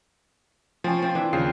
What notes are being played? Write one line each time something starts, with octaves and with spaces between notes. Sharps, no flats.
F3 C4 C#4
C4 F4
E3 D4 E5
D#2 C#3 F3 C7